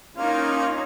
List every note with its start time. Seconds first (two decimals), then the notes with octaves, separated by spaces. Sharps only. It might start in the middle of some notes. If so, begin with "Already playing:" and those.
0.16 A#3 C#4 D#4 F4